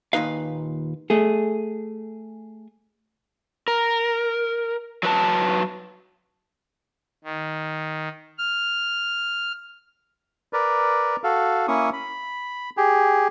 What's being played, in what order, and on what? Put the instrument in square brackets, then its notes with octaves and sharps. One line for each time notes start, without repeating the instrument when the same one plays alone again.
[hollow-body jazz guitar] D#2 A#2 D#4 B4 F5
A3 G#4
[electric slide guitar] A#4
F#3 B4 A5
[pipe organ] D#3
F6
[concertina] A#4 B4 D5
F#4 A4 F5
A#3 C#4 E4 C#6 D#6
B5
G4 G#4